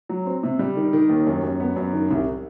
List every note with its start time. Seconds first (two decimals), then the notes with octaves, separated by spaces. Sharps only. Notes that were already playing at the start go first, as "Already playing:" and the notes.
0.09 F#3
0.26 C4
0.43 C3
0.59 G3
0.77 D#3
0.93 D#3
1.10 D#2
1.27 F#2
1.43 F#2
1.60 B3
1.76 F#2
1.93 D#3
2.10 C2